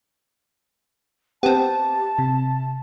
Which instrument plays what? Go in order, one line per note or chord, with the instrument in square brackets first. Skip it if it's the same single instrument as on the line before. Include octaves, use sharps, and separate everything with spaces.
[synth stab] B3 C4 [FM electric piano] G4 [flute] A5
[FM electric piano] C3